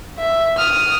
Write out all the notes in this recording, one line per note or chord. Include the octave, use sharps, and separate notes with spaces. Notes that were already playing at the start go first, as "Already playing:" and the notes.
E5
D#6 F6